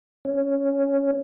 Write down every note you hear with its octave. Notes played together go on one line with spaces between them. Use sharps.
C#4